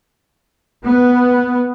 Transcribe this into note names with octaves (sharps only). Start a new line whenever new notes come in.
B3